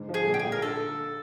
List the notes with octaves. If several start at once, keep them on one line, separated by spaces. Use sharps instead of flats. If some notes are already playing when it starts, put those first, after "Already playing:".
Already playing: G#2 D3
F3
G#4
A#1
G4
G#4
A#1
A#4
D3 A4